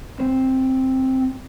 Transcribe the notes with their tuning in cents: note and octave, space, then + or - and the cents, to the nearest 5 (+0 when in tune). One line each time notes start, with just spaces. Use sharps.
C4 +5